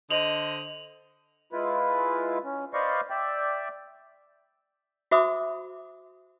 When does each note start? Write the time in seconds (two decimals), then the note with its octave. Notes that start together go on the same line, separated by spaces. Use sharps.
0.11 D3 C5 D#5 F7 F#7
1.53 G#3 E4 F4 B4
2.44 C#4
2.74 B4 C5 D5 D#5 F5 C#6
3.10 D5 E5 G5
5.11 F#4 C5 E5 B5 D6 D#6